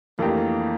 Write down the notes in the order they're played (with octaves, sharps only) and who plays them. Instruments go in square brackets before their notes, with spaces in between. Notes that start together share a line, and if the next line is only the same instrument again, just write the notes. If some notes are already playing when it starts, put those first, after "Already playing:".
[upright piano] F2 E3 A3 D4 G4 [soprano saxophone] A#3